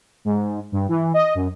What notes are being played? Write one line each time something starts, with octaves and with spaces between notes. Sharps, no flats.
G#2
G2
E3
D#5
F#2